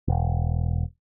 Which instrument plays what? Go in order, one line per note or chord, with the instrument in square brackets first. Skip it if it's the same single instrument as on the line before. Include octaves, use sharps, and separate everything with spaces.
[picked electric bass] E1